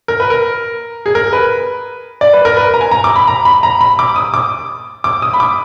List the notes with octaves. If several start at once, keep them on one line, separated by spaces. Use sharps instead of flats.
A#4
B4
A#4
G#4
A#4
B4
D5
B4
A#4
B4
A#5
G#5
A#5
D6
B5
A#5
B5
A#5
B5
D6
D#6
D6
D6
D#6
B5
D6